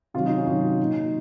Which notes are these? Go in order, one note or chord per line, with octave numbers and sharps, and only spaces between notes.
C3 D#3 F#3 F4
D#4
C#4
C3 D#3 F#3 D#4
A#2 F#3